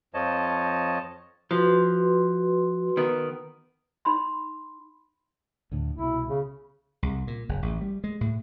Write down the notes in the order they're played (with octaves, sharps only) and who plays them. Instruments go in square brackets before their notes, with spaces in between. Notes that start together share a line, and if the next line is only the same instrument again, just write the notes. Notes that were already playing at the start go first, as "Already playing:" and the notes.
[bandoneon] F2 F3 C#5 D#5 A5
[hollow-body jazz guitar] F3 [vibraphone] F#4 B4 C6
[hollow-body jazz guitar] D#3 B3
[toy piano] D#4 B5 C6
[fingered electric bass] D2 A2 D3
[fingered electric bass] C2 B2 [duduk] E4
[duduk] C#3
[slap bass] C2
A#2
F#1
A1
G3
G#3
A2